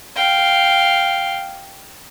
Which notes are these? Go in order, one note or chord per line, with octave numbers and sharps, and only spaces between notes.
F5 G5